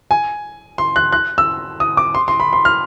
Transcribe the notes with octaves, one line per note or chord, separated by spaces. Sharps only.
G#5
C6
F#6
F#6
E6
D#6
D6
C6
C6
B5
C6
F6